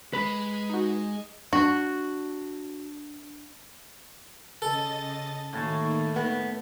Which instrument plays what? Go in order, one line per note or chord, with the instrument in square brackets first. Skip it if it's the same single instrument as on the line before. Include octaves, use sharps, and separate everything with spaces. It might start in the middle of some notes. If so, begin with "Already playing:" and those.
[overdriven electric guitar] G#3 [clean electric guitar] B4 B5
[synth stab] D#4 F#4
[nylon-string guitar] D4 [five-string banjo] F#4
[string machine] C#3 D#5 A6 [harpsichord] A4
[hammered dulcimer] A2 A5 C#6 [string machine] D#3 A#3
[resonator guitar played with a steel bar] B3